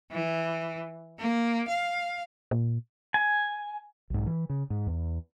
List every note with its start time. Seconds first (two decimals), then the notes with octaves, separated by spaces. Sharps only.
0.12 E3
1.19 A#3
1.68 F5
2.51 A#2
3.14 G#5
4.10 B1 G#2
4.26 E3
4.50 C#3
4.70 G#2
4.87 E2